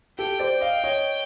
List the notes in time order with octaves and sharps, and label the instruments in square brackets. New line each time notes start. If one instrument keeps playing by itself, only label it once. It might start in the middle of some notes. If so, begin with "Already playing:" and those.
[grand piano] G4 A4 [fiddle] G5
[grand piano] C5 D5
D#5 F5
C#5 D#5